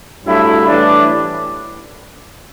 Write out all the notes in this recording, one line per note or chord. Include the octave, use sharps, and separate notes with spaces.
G2 F#3 A3 E4
A2 E3 G3 D4